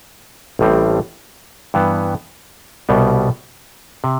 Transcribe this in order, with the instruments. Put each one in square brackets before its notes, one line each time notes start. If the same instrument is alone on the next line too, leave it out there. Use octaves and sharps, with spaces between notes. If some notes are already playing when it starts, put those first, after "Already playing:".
[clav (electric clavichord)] A1 A2 G3 C4
G2 E3 B3
C2 B2 G3 B3
C3